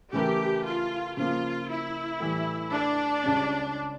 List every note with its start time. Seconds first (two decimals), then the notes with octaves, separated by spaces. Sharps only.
0.13 C#3 E3 A3 E4 G4 A#4
0.65 F4
1.17 C#3 F3 A#3 F4
1.69 E4
2.20 A2 E3 G3
2.72 D4
3.24 C#2 C#3 G3 C#4